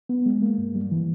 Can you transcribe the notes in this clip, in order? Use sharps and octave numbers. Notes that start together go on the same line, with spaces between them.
B3
G#3
A#3
G2
G3
E3